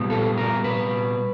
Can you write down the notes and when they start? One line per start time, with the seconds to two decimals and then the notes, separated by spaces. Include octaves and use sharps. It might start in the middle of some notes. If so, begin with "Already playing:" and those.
Already playing: A#2 G3 B3
0.10 A4
0.38 A#4
0.64 B4